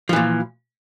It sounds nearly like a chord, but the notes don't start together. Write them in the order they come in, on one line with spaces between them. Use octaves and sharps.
F3 E3 A#2